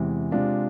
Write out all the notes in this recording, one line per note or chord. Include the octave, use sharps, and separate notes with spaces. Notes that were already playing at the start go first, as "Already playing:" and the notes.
Already playing: E2 C3 E3 G#3
C3 G#3 D4 F4